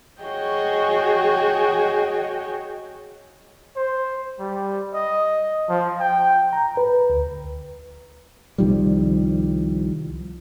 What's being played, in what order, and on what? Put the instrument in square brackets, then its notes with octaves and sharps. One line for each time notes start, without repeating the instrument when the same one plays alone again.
[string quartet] F#4 G#4 C#5 D#5 G5
[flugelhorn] C5
G3
D#5
F3
G5
[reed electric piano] A#5
B4
D2
[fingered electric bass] C2 D#3 F3 G3